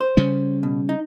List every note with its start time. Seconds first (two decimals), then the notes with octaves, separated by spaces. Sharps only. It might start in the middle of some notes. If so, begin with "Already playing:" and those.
0.01 C5
0.17 C#3 G3 C#4
0.63 B2
0.89 D#4